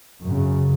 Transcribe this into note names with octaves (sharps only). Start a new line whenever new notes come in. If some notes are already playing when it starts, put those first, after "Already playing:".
F#2 C#3